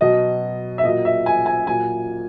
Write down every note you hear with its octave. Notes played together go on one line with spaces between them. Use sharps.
B2 F#3 D#5
E5
A#2 F#3 D#5
E5
G#5
G#5
A#2 F#3 G#5